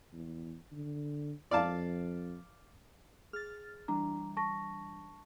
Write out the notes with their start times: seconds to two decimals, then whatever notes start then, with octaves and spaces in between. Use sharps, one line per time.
0.13 E2
0.72 D3
1.51 F2 D5 F5 A5
3.33 G#4 F6 A6
3.88 E3 G3 D4 A#5
4.37 A5 C#6 A#6